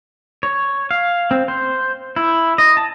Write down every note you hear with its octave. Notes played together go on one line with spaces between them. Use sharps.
C#5
F5
C4
C5
E4
D#5
A5